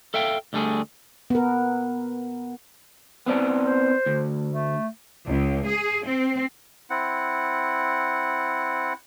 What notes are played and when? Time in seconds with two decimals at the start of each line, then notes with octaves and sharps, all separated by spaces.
0.14 A4 E5 F5 G5
0.53 D2 D3 G3 A3 G#4
1.30 B3 A#4
3.26 B3 C4 D5
3.62 C5
4.06 D2
4.48 A3
5.26 C#2
5.66 G#4
6.06 C4
6.90 C4 E4 F#5